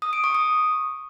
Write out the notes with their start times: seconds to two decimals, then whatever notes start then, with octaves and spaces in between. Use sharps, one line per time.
0.02 D#6
0.13 D7
0.24 C#6
0.35 D#6